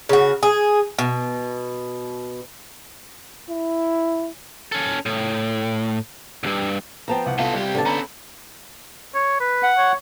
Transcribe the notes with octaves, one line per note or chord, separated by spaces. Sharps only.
C#3 F#4
G#4
B2
E4
C#4 A4
A2
C2 G2
F3 B3 C4 G5 A5 A#5
C2 F#5
B3 F4 A4 F5
C2 G3 G4
D3 B3 A5
C#4 A4 A#5 B5
C#5
B4
F#5
C#5